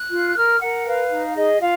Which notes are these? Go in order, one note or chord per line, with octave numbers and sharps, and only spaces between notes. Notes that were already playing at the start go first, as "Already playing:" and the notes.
Already playing: F#6
F4
A#4 F6
A#4 F#5
B4 F5
D#4
G#4 D#5
F4 F5